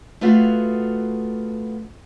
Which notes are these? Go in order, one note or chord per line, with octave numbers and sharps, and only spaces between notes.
A3 B3 F4 F#4 G#4 F5